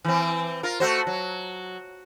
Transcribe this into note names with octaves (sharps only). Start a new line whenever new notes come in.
E3 C4
F4 A#4
A3 F#4 C5
F#3